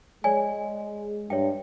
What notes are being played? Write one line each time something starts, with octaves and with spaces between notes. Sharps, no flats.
G#3 C#5 D5 G#5
G2 C#5 E5 G5